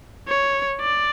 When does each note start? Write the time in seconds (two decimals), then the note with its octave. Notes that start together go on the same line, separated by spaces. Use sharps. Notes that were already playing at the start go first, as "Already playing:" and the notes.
0.28 C#5
0.81 D5